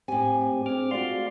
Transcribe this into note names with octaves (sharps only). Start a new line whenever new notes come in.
A2 C4 G4 G#5
C4 D4 G#4 D6 F6
A3 F4 F#4 D5 F5 C6